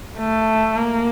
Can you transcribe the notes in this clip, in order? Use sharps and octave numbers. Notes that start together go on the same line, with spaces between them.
A3
A#3